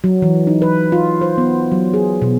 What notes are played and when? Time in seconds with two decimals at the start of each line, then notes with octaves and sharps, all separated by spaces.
0.04 F#3
0.22 E3
0.47 D#4
0.62 B4
0.92 F4
1.21 C5
1.38 B3
1.72 F#3
1.94 G#4
2.22 B2